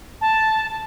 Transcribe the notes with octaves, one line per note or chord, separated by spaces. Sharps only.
A5